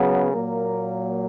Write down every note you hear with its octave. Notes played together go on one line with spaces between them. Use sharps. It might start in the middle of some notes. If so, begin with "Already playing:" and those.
Already playing: C#3 F#3 B3 G#4
A#2 F#3 A#3 A#4